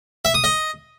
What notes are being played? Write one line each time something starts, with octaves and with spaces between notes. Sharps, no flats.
E5
D#6
D#5